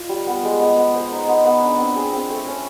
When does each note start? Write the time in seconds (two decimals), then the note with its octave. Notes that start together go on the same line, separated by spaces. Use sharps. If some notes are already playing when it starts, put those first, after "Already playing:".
Already playing: F4
0.09 G3
0.27 B3
0.43 G#3
0.60 B3
0.77 B3
0.94 C5
1.11 D#4
1.28 B3
1.44 B3
1.62 D4
1.79 C4
1.96 G#4
2.13 C4
2.30 A3
2.47 C#4